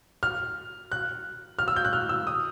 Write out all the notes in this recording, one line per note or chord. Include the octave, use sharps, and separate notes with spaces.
F6
F#6
F6
E6
G6
F#6
F6
E6
D#6